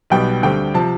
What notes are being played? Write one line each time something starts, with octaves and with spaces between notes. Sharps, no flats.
B1 B2 G3 B3 G5
D2 D3 G3 C4 G5
C3 F3 A5